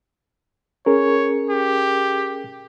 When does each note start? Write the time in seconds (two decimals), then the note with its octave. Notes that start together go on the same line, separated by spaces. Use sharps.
0.86 C#4 G#4 A#4 C#5
1.50 G4